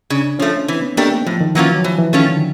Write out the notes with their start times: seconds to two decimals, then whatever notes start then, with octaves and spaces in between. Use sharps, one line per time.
0.10 C#3 D4
0.39 F3 A3 C#4
0.68 E3 C4
0.82 B3
0.97 A3 A#3 D4 G4 A#4
1.11 A3
1.26 A2 F3
1.41 D#3
1.55 E3 F#3 A#3 C#4 F4
1.70 F#3
1.84 E3 F3
1.99 E3
2.13 D#3 A3 C#4 F4
2.27 D3